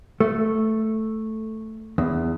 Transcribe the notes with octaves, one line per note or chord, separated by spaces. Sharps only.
A3
E2